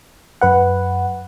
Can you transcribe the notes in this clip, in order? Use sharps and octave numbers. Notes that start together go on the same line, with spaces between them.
F#2 B4 F#5